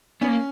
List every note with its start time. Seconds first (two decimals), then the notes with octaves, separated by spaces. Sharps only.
0.21 B3 C#4
0.28 A#3